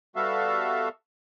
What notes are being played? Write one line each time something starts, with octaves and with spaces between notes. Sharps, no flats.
G3 B3 F#4 A4 E5 F5